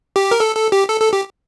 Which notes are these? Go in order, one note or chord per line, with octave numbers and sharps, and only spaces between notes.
G4
A#4
A4
A4
G4
A4
A4
G4